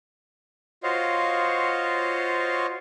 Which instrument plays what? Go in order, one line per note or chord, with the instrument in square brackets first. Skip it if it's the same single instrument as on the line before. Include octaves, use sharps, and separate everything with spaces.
[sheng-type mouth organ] F4 F#4 C5 C#5 D#5 F5